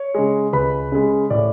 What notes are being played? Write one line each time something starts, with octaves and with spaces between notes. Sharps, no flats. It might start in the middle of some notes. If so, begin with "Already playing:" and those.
Already playing: C#5
C#3 G#3
C#2 B4 B5
C#3 G#3
A2 D5